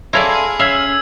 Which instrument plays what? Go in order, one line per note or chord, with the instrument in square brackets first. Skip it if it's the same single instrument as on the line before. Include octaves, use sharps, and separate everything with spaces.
[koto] E4 C#5 D5 [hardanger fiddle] G#4 [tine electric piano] A4 F5 C6
[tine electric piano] C#4 [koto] E5 F5 [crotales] E6 G#6